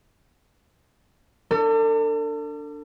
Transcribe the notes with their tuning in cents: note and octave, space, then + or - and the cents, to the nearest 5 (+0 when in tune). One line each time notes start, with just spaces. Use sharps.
D4 +0 A4 +40